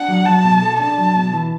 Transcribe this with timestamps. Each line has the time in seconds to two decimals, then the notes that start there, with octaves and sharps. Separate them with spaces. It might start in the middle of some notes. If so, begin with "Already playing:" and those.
Already playing: D4 F#5
0.08 F#3
0.25 F#3 A5
0.44 B2
0.62 A4
0.80 D4 A5
0.98 F#3
1.15 B2
1.33 E3